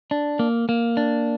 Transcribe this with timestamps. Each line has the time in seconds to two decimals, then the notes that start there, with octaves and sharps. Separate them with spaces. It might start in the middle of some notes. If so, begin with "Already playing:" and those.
0.11 D4
0.39 A#3
0.69 A#3
0.97 D4